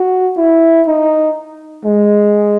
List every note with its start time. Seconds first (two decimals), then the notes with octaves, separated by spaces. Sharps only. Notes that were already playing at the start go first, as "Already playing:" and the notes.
Already playing: F#4
0.37 E4
0.87 D#4
1.85 G#3